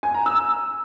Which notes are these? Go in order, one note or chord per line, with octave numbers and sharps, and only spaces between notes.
G#5
A#5
E6